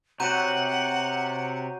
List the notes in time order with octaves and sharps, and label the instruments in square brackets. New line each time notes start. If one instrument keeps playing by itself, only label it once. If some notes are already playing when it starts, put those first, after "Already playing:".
[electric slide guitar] C3 [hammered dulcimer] F#4 C#5 D5 [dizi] F#5 [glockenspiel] A#5 G6 D#7